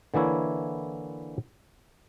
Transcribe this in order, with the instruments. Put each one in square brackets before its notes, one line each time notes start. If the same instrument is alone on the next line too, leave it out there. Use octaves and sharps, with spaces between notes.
[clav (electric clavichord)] D3 E3 A#3 E4 C#5